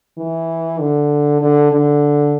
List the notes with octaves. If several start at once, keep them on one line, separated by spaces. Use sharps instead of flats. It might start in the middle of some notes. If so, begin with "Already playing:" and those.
E3
D3
D3
D3